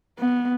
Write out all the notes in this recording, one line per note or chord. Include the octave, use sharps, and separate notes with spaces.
B3